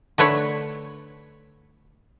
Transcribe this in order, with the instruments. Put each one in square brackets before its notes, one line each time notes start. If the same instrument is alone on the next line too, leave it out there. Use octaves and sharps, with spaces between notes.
[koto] D3 A3 B4 C#5